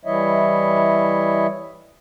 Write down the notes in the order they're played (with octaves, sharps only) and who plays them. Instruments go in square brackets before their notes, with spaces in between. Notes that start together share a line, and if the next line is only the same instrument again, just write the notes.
[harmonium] E3 G3 E4 C#5 D#5 E5